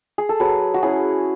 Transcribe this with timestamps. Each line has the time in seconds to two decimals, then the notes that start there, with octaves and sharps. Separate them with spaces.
0.18 G#4
0.29 A4
0.40 F#3 G#4 B4
0.74 F#4
0.82 C#4 E4 G#4